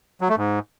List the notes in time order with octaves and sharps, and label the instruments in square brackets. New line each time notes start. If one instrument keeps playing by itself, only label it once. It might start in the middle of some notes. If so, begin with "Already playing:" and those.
[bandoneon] F#3
A3
G#2